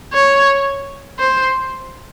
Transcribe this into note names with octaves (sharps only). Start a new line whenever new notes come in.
C#5
C5